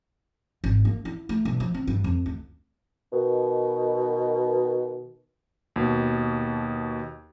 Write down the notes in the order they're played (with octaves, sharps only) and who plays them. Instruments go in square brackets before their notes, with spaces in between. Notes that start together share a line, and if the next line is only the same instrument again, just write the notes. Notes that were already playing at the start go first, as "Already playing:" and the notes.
[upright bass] G#1
A#3
E4
A3
B1
F3
C4
G2
F2
D2
[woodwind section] B2 D#3
[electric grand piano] D#2 B2